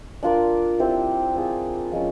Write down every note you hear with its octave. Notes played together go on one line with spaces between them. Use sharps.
D4 F4 A#4 D5
C4 E4 G4 C5
C4 F4 G#4
F3 G#3 C#4